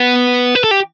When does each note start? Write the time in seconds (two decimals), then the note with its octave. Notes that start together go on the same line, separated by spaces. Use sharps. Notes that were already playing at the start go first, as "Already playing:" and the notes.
Already playing: B3
0.55 B4
0.64 A4
0.71 G4